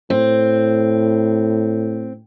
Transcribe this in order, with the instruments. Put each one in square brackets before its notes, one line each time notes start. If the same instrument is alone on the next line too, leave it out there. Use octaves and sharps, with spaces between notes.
[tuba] A2 [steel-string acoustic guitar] C4